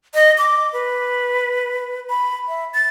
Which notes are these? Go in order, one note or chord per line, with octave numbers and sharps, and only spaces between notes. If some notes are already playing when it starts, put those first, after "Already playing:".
D#5
D6
B4
B5
E5
A6